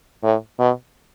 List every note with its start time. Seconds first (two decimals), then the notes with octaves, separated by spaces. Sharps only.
0.24 A2
0.59 B2